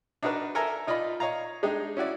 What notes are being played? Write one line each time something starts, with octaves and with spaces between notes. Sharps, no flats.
D4 D#4 F#4 A#4 B4 A5
A4 A#4 E5 G#5 A#5
D#4 F4 D5 D#5 B5
C#5 D#5 F5 A#5
G#3 D4 D#4 G4
C#4 E4 F#4 D5